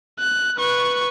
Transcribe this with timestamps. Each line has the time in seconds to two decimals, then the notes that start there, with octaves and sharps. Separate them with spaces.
0.19 F#6
0.58 B4 C#6